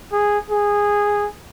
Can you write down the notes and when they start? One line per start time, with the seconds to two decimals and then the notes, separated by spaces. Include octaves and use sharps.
0.12 G#4
0.50 G#4